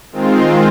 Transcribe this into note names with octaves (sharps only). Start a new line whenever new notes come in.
D#3 G#3 C4 F4